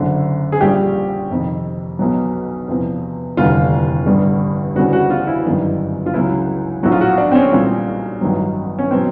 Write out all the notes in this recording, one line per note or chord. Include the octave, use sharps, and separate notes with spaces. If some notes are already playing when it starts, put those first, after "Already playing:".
Already playing: F#1 F#2 D3
G#4
A#1 A#2 G3 G4
F2 C3 D#3
B1 B2 F#3
E2 C3 F3
F1 D#2 D3 G3 F4
A1 G2 D3 G3
D2 C#3 E3 G3 F#4
F#4
F4
E4
G1 F#2 D#3 G3
F4
C#2 C#3 F#3 E4
A#1 A2 F#3 F#4
F4
F#4
D4
C4
C#4
B1 A#2 G3 C4
A1 G2 D#3 F#3
C#4
B2 F#3 C4